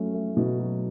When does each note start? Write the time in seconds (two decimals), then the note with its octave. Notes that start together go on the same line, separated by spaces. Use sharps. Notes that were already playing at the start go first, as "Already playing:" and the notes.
Already playing: F#3 A3 C#4
0.14 A3
0.37 B2
0.59 F#3